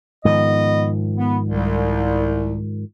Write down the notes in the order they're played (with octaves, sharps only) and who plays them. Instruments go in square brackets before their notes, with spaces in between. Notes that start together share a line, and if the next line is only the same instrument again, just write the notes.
[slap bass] G#2 D#3 F3 [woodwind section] B3 D#5
[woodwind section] B3
C2